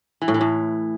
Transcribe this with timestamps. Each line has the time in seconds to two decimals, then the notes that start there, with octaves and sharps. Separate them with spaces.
0.22 E3
0.28 A2
0.34 E3
0.41 A2